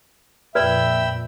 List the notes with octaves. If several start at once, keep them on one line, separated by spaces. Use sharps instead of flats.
F2 A#2 B4 D5 E5 G5 B5 E6